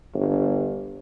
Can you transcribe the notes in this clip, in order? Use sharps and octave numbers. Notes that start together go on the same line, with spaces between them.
G1